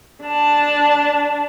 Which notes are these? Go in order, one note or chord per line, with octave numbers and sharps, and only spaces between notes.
D4 A5